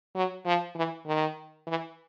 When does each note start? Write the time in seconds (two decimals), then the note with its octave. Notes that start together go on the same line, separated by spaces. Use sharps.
0.16 F#3
0.46 F3
0.76 E3
1.07 D#3
1.67 E3